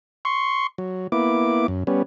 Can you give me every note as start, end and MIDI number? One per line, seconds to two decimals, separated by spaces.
0.25 0.67 84
0.25 0.67 85
0.78 1.07 54
1.12 1.67 58
1.12 1.67 59
1.12 1.67 64
1.12 1.67 86
1.68 1.83 42
1.87 2.02 55
1.87 2.02 59
1.87 2.02 61